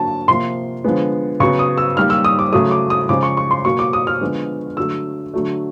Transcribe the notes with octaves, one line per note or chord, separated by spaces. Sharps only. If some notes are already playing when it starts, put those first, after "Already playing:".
Already playing: D3 F#3 A#3 A5
C3 F3 A#3 C6
D3 F3 G#3 B3
C#3 F#3 B3 C#6
D#6
E6
D#3 G3 A#3 F6
E6
D#6
D6
C#3 F#3 A3 D#6
D6
D#6
C#3 F3 G#3 D6
C#6
C#6
C6
B2 F#3 A#3 C#6
D6
D#6
F6
D3 F3 G#3 B3
D3 F#3 A3 E6
D3 F#3 A3